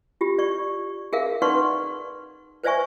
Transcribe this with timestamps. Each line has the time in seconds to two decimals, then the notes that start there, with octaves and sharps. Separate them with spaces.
0.21 F4 G4
0.38 D5 C#6
1.13 G#4 A#4 E5 F5
1.42 D#4 B4 D5 F#5 C6 C#6
2.64 B4 C5 D5 E5 G#5 C#6